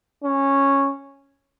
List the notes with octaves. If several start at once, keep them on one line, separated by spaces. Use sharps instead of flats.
C#4